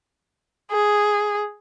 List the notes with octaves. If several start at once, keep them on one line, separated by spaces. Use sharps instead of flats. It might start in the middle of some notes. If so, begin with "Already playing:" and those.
G#4